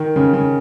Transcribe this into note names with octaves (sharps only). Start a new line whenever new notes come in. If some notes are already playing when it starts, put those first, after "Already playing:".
Already playing: D#3
C#3
C#3